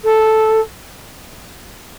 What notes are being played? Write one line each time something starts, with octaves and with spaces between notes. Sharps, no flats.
A4